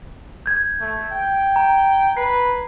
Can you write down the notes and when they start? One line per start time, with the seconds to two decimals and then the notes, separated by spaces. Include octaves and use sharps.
0.46 G6 G#6
0.81 A3
1.12 G5
1.56 A#5
2.17 B4 C7